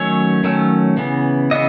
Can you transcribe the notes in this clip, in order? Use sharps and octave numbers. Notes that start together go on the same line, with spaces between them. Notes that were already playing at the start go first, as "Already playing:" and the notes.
Already playing: D#3 F#3 A3 C#4 C#5
D#3 F#3 A3 C#4
C#3 E3 B3
C#3 E3 B3 D#5